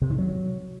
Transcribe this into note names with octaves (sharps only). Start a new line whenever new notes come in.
C3
D#3
F#3